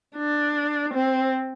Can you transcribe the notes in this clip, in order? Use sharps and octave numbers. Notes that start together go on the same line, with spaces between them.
D4
C4